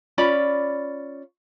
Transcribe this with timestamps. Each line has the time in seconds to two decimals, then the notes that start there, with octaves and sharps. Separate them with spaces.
0.18 C#4 F4 D5 B5